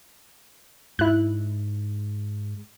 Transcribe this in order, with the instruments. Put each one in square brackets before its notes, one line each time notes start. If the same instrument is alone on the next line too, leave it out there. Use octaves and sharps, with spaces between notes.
[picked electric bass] G#2 [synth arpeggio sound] E4 F#6